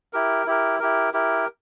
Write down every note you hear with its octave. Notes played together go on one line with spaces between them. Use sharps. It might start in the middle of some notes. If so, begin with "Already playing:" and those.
E4 G4 A#4
E4 G4 A#4
E4 G4 A#4
E4 G4 A#4